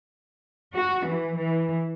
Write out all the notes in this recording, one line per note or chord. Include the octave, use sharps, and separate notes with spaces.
F#4
E3
E3